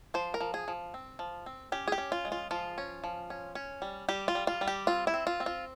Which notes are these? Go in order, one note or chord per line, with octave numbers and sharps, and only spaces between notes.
F3 C5
A#4
F3
G#4
F3
C4
F3
C4
C#4 G4
G#4
G4
C#4
F4
G#3
F4
F3 F4
C#4
F3
C#4
C#4
G3
G3 G4
F4
G3
F4
G3
G4
C4 F4
E4
C4
F4
C4
F4